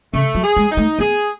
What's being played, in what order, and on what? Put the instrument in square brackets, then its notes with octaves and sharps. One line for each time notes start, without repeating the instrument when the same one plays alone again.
[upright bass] C#3 [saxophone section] A3
[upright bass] F#3
[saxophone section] G#4
[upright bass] G#3
[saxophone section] D#4
[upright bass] A3
[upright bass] B3 [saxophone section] G#4